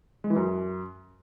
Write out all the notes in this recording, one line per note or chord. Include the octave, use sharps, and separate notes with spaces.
G#3
E3
F#2